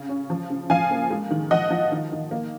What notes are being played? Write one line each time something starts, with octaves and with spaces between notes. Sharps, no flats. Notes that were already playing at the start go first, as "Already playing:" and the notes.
Already playing: C#3
C#4
F3
C#3
F3 F5 G#5
A#3
G#3
D#3
F3 D#5 F#5
F3
D#3
D#3
A#3